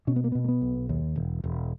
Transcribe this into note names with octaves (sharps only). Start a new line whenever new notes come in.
B2 C#4
B3
A#3
B3
B2
A#3
B3
B1
D#2
E1
E1